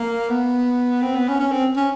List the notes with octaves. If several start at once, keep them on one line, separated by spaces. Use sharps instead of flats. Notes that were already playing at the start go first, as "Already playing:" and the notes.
Already playing: A#3
B3
C4
B3
C#4
C#4
C4
C#4